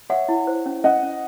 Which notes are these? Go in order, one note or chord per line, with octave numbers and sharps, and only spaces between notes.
C#5 E5 F#5
E4
C5
C#4
C#4 D#5 F#5
C#4